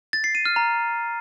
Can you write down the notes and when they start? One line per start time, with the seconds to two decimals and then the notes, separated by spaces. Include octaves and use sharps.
0.13 A6
0.24 C7
0.35 D#7
0.45 F6
0.56 A#5